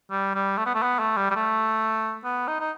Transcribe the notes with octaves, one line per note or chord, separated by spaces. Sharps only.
G3
G3
A3
B3
A3
B3
A3
G3
G3
A3
B3
D#4
D#4